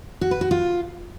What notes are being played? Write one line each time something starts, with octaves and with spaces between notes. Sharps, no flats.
F#4
B4
F#4
F4